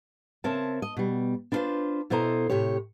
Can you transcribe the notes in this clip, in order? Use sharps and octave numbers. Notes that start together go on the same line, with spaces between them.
C#3 C4 A#4 C#5 E5 A5
D#5
B2 G3
D4 E4 F4 G4 B4 C5
B2 E4 A4 C5 D#5 A#5
A2 C3 G4 C#5